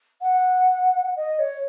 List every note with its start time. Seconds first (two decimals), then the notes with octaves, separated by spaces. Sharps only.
0.22 F#5
1.16 D#5
1.39 C#5